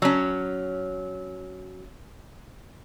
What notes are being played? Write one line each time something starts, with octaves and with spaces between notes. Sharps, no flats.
F#3 C#4